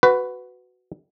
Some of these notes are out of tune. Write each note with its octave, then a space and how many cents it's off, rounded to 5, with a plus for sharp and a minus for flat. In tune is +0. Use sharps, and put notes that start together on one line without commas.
F#4 +0 B4 +15